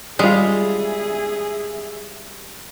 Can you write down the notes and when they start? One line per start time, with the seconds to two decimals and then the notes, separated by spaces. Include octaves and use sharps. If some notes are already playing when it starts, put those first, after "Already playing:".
0.19 G3 G#3 F4 G#4 E5